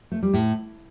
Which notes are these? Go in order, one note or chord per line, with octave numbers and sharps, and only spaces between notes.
A3
G3
A2